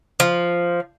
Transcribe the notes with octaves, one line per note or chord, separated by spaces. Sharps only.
F3